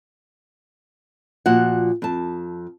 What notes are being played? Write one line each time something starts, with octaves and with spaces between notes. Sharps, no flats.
A#2 F3 F#4 F#5
F2 A5